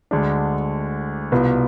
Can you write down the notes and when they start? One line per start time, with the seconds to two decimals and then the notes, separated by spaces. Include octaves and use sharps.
0.11 D2 D3 G#3 D4
1.32 C2 B2 B3 F4